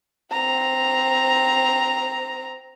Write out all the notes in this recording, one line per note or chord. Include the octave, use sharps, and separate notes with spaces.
C4 A#5